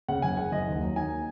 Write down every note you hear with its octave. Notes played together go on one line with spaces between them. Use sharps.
C#3 F#5
F#1 G#5
G#3 F#5
F#1 D#5
D#2
F#3
D#3 G#5